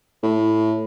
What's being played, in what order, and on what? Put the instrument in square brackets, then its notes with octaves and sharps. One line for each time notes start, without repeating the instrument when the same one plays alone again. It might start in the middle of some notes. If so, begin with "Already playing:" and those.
[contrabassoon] A2